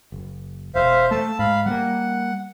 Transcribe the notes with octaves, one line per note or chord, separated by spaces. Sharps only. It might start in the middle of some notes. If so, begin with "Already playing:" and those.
F#1
E1 C5 E5 F5
A3 A5 E6
G#2 F5 B5
G3 A3 A#3 F#5